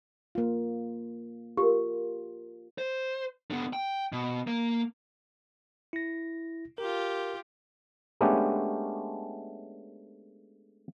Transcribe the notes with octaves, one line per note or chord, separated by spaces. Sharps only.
A#3 F4
F4 G4 A#4
C5
D3 B3
G5
B2
A#3
E4 A#6
F4 G4 A#4
G#3 A3 B3 C#4 D4 G4